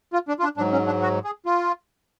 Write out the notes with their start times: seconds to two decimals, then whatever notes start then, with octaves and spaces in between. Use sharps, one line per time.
0.13 F4
0.28 D4
0.39 F4
0.43 D4
0.57 G#2 F#3 D4
0.73 C#4
0.87 D4
1.02 F#4
1.24 G#4
1.46 F4